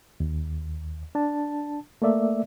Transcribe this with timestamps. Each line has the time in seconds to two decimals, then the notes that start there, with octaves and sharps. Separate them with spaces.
0.20 D#2
1.15 D4 A5
2.02 A3 A#3 D5 E5